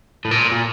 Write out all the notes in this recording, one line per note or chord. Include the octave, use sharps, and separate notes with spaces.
A2
A#2
A#2